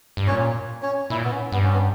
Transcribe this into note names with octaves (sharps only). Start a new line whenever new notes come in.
G2
A#2 C#4 C#5
C#4 C#5
A#2 E4
B3
C#4
G2 B3
C#4
B3